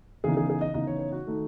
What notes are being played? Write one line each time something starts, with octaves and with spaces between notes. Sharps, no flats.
C#3 E3 B3 D#4 G#4
G#4
G#4
D#5
C#3 E3 B3 D#4 D#5
C#5
C#5
F#4
D#3 A3 D#4